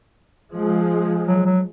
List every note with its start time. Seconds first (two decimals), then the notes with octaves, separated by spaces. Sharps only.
0.53 F3 G#3
1.27 F#3
1.46 F#3